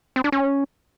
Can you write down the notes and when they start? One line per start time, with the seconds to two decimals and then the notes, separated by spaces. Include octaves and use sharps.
0.16 C4
0.24 D4
0.32 C#4